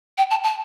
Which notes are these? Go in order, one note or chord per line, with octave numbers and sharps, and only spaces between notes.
G5
A5
A5